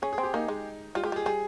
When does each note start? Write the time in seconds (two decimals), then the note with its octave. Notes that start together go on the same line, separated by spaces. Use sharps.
0.02 C#4 G#4
0.13 G#4
0.18 C4
0.23 G4
0.34 A#3 D#4
0.48 G#3
0.95 G3 F4
1.04 G#3 G4
1.12 G3 G#4
1.26 G3 G#4